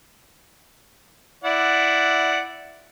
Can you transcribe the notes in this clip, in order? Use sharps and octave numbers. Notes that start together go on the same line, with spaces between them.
E4 D5 F#5